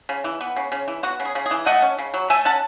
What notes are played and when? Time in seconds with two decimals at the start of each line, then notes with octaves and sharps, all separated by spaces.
0.09 C#3
0.24 E3
0.41 B3
0.56 C#3
0.72 C#3
0.88 E3
1.03 B3 F#4
1.20 C#3
1.25 G#4
1.35 C#3
1.46 G#4
1.51 E3
1.66 A3 D#5 F#5
1.82 C#4
1.99 C#3
2.14 F#3
2.30 A3 E5 G#5
2.45 C#4 F#5 A5